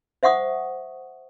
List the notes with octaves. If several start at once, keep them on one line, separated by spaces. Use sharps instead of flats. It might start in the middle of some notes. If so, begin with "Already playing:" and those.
C5 E5 F#5 C#6 D#6